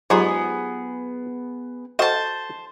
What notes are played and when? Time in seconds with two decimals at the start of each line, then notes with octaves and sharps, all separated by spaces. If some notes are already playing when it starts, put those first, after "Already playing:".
0.10 G#2 F#3 B3 F4 G4 G#4
1.99 F#4 A4 C5 D#5 A5